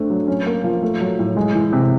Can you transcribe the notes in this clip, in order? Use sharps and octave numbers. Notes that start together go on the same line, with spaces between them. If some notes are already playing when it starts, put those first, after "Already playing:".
Already playing: A3 C4 D4
F#3
C#4
A#3
F3
A3
F#3
A2
G#3
E3
C3